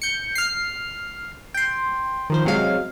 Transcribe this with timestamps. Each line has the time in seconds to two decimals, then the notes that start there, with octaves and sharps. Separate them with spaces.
0.02 G6 C#7
0.35 F6 C7
1.54 G5 C6
2.30 D#3 F3 C5
2.45 C3 F#3 G#3 F5